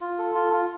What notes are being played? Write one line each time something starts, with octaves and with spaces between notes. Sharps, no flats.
F4
A4
F4
F4